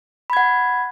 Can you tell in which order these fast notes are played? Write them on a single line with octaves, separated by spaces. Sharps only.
B5 G#6 F#5